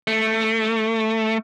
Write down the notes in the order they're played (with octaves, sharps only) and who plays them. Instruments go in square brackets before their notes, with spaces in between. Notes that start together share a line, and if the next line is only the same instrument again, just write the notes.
[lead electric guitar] A3